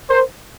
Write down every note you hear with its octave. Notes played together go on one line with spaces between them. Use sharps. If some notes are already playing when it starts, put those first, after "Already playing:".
A#4 C5